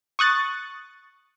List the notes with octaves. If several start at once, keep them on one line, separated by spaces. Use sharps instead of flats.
C#6 D#6 F#6 A6